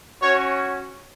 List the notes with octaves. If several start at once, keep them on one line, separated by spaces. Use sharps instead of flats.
C#4 F#4 C#5